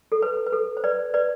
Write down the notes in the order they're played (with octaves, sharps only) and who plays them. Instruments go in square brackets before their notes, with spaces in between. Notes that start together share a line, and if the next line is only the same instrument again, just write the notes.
[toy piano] A4
B4
B4
A4
C5
B4 D5
B4 D5